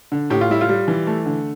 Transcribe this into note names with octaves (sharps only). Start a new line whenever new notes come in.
D3
A2 G4
F4
G3 E4
F4
G3
E3
A3
D3